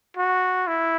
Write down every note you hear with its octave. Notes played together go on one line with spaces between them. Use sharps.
F#4
E4